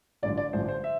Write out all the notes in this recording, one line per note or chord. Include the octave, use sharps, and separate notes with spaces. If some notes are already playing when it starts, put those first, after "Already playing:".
A1 G2 D3 F3 D5
D5
A1 G2 D3 F3 C5
C5
E5